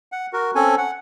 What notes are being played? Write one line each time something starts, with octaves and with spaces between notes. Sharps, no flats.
F#5
F#4 A#4
C4 C#4 A4 G#5
F#5